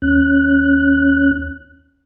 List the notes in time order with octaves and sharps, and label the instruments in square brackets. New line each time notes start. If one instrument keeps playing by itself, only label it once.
[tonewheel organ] D#2 C#4 F#6